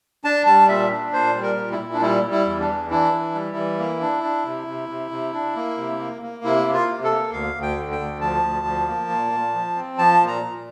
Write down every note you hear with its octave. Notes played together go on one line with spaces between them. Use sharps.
D4 A5
G3 A5
A#2 E5
D4
A#2 C5
G3
A#4
A#2
E4
A#2
D4
G3 E4
G3
E4
E2
D4
E3
D4 E4
E3
G3
E3
A#3
D4
D4
C3
C3
C3
C3
D4
A#3
C3
A#3
A#3
C3 E4
A#3
F4
C3
A4
A#3
D2 F5
D2
G5
D3
G5
D2
F3 A5
D2
F3
A#3
A#2
A#2
F3
C4
F3 A5
A#2
A#5
A#2